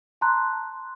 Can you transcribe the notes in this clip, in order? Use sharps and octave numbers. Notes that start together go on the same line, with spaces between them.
A5 A#5 C6 F#6